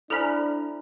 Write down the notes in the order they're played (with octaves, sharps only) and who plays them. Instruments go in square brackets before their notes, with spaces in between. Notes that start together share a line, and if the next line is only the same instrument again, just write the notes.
[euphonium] D4 [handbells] E4 A#5 [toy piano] A4 C5 G#5 [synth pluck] B5 F6